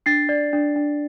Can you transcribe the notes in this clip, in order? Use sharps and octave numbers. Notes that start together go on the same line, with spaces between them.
D4 A6 C7
D5
D4
D4